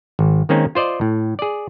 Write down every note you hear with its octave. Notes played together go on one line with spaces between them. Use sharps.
G#1
D#3 G#3 A#3 C4 C#4 D#4
F4 C5 D5 D#5
A2
G#4 D5